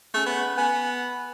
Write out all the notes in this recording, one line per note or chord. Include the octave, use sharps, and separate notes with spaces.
A3 C#4 G#4
B3
B3 G#5